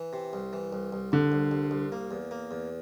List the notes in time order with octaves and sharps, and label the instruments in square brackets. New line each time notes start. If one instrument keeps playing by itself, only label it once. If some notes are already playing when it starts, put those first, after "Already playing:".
Already playing: [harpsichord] E3
C3
C2
E3
C2
C2
[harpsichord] C2 [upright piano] D3
[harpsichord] C2
C2
C2
A#3
E2
A#3
E2